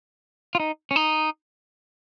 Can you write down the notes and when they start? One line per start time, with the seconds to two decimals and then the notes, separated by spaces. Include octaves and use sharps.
0.55 F4
0.60 D#4
0.91 C#4
0.96 D#4